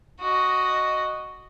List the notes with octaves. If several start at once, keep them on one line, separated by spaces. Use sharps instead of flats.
F#4 D#5